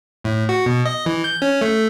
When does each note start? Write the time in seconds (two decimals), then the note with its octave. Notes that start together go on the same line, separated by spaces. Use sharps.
0.24 A2
0.49 F#4
0.66 B2
0.86 D#5
1.06 E3
1.24 G6
1.42 C#4
1.61 A3